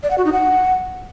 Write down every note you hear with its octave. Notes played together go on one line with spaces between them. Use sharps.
D5
F#5
F#4
D#4
F#5